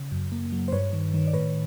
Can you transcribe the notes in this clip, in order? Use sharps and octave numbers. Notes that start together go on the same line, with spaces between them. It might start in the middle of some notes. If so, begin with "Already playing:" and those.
Already playing: C#3
F#2
A#3
F#3
C5
G2 B4 C#5
D#3
D#3
D5
A2 B4 C#5